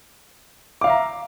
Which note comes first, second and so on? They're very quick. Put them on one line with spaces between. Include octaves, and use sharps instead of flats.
D6 F5 E5 A#5